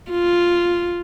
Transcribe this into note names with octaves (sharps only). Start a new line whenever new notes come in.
F4